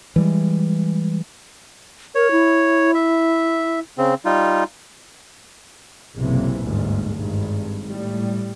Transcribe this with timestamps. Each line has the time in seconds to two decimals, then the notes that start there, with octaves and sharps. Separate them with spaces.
0.16 E3 G3 G#3
2.15 A#4 C#5
2.32 E4
2.94 E5
3.98 C#3 C4
4.25 G3 D#4 F4
6.16 F#1 B1 C3 E3 A#3
6.65 G1 D2 G#2
7.15 G#1 G2
7.88 A2 G3